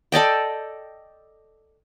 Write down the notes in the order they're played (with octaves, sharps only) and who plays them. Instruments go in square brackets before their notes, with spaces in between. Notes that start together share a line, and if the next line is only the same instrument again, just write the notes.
[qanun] A4 D5 D#5 G5